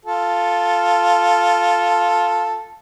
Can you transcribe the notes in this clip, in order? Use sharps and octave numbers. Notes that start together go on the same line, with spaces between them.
F4 A4